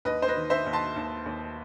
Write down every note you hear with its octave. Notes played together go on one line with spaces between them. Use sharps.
D#2 B4 D#5
C5
B4 D#5
D#3
C5 E5
D#2
A5 C6
D#2
D#2